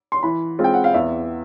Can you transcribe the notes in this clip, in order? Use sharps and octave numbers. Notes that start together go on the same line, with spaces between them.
C6
E3 B5
G#3 C4 F4
G5
F#5
F5
E2 E5